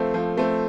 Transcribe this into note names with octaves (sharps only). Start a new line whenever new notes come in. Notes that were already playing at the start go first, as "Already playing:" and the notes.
Already playing: F3 A3 C4 A4
F3
A3 C4